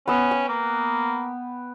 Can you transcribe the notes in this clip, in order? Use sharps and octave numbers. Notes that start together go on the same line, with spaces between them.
B3 C#4 E6
G5
A#3